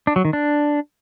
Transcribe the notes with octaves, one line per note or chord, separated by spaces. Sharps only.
D4
F#3
D#3
D4